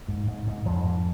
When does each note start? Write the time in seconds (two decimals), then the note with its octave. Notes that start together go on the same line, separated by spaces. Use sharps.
0.08 G#2
0.28 G#2
0.47 G#2
0.66 F2 G#2 F3
0.85 G#2